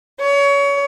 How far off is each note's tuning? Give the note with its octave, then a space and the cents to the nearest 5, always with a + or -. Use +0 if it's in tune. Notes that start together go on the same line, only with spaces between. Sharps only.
C#5 +25